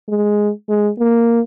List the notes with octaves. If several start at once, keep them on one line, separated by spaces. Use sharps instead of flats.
G#3
G#3
A#3